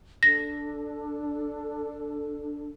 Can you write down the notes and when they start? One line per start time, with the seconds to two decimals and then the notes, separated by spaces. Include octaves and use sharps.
0.23 D4 A4 A#6